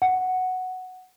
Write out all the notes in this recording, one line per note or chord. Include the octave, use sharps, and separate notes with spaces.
F#5